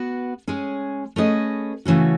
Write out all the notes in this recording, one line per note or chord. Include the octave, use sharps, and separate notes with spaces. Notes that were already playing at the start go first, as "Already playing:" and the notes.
Already playing: B3 F#4 B4
G#3 C#4 G#4
A3 C#4 G#4 B4 D#5
C#3 E3 A3 C#4 F#4